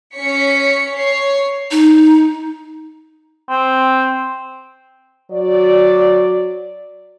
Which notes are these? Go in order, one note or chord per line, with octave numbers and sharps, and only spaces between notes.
C#4 C#5 B6 C#7
C#5 C7
D#4
C4
F#3 F#4 D5